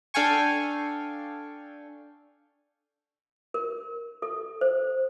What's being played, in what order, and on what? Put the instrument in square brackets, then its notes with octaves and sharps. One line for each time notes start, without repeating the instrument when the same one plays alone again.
[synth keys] D4 A4 F5 G5 G#5 C#6
[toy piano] A#4
A4
C5